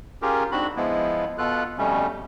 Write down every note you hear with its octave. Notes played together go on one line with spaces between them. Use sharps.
C#4 F4 G4 G#4 A#4
G#2 C4 D4 F#4 B5
F3 G#3 B3 E4
B2 B3 F4 A4 F#6
F2 B2 G3 A3 C#4